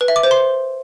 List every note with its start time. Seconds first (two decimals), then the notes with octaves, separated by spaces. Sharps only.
0.01 B4
0.08 E5
0.16 D6
0.23 C5
0.31 C6